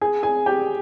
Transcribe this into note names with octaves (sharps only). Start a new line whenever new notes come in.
G#4 G#5
G#4 G#5
G4 G5